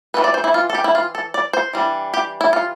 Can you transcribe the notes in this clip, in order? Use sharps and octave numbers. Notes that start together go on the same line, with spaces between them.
E3 A3 C4 B4
D5
C5
E4
F4
A4
G4
E4
F4
A4
D5
C5
E3 G3 D4
G4
E4
F4